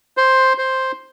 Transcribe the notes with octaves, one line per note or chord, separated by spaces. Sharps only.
C5
C5